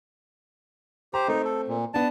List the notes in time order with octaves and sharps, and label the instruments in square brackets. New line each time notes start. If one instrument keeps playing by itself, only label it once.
[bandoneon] G4 C5 [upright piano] A#5
[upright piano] A3 C4 [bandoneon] D#4
[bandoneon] A4
A#2
[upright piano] B3 D4 [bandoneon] A5